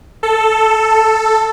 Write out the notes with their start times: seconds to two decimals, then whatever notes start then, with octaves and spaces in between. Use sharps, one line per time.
0.23 A4